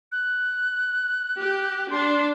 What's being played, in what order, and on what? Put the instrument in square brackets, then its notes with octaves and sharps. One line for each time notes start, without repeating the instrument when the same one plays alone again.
[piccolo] F#6
[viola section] G4
[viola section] D4 [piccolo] C6